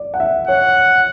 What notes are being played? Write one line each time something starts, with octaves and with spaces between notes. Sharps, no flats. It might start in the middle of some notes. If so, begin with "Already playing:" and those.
Already playing: D5
F#5
E5
C#5 F#5